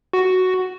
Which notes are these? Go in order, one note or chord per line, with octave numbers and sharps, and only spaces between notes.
F#4